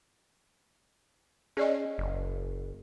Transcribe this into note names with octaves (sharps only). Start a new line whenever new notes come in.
C#4 G#4 D5 D#5
F#1